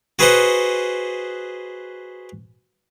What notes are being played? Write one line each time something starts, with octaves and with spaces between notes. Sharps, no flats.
F#4 G#4 B4 C5 D#5 F#5